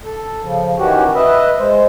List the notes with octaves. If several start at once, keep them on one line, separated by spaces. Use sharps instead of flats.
A4
C#3 F3
D#3 E3 C#4 F#4 G4
B4 D#5 E5
G#3 C5